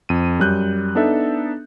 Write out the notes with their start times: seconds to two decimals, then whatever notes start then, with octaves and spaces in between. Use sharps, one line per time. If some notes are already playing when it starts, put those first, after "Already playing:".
0.09 F2 D#7
0.39 F#2 G3 F#6 G6
0.95 B3 D4 D#4 A4 E5